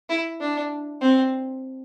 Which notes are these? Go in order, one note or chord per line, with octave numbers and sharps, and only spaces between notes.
E4
D4
C4